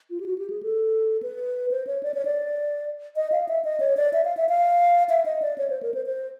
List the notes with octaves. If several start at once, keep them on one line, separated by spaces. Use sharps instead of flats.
F4
G4
F#4
G4
G#4
A4
B4
C5
C#5
D5
C#5
D5
D#5
F5
E5
D#5
C#5
D5
E5
F5
E5
F5
E5
D#5
D5
C#5
C5
A#4
C5
C5